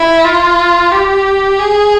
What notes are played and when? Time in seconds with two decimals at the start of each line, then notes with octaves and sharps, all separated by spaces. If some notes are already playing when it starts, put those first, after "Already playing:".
Already playing: E4
0.24 F4
0.92 G4
1.59 G#4